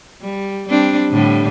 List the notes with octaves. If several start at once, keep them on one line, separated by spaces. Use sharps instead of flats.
G3
G3 C4 D4
A2 D3 G3